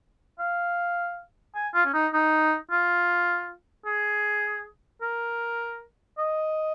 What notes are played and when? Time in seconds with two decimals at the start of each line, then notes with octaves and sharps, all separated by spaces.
0.39 F5
1.55 G#5
1.74 F4
1.85 C#4
1.94 D#4
2.13 D#4
2.71 F4
3.86 G#4
5.02 A#4
6.18 D#5